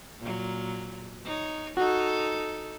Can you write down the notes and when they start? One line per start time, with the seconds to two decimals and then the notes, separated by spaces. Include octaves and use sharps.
0.20 A#2 F#3
1.24 D#4 C#5
1.77 D#4 F#4 A4